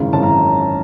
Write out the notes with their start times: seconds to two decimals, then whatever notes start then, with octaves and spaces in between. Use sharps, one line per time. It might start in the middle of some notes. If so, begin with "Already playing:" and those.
Already playing: G#1 F#2 C#3 E3
0.13 G#1 F#2 C#3 E3 A5
0.23 A#5